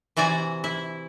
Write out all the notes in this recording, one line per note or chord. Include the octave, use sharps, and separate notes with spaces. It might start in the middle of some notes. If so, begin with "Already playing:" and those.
C3 E3 F#4 D5 G#5
E4